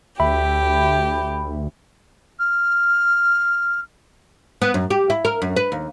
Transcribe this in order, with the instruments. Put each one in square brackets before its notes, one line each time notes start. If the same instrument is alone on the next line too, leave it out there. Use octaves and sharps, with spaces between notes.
[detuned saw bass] D2 [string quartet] G4 [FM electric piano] E5 B5
[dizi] F6
[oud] B3
F#2
G4
E4
A#4
F#2
B4
D#2